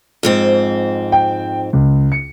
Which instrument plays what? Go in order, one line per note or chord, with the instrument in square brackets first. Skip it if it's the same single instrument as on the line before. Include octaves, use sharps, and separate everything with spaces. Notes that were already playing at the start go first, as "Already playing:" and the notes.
[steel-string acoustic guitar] F2 G#2 C4
[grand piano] G5
C#2
C#7